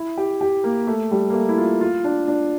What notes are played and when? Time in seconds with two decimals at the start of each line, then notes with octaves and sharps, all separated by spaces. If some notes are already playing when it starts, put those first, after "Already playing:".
Already playing: E4
0.17 G4
0.41 G4
0.64 A#3
0.87 A3
1.11 G3
1.30 A#3
1.34 A3
1.49 E4
1.58 F4
1.81 F4
2.04 D4
2.28 D4